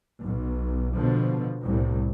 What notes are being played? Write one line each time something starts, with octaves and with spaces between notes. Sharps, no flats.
B1
B2 D3 F3
C2 A2